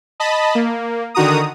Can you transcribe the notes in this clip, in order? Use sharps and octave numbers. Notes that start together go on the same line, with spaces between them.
D#5 A5 B5
A#3
D3 D#3 F#4 A#5 D#6